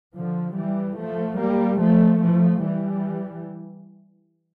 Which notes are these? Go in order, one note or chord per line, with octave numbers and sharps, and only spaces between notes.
D3 F3
E3 G3
F3 A3
G3 A#3
F3 A3
F3 A3
E3 G3